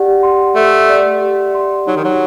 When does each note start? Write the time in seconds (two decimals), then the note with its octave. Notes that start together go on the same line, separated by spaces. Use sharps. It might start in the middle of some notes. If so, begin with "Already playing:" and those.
Already playing: G4 D5 F#5
0.23 C6
0.55 A3 G4
0.89 D5
1.21 G4
1.54 C6
1.87 F#3 D#4
1.96 D#3
2.05 F#3